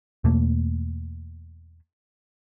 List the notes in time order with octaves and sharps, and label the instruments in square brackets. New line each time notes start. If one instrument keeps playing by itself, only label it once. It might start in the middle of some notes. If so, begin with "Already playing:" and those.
[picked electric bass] E2 B2 A3 A#3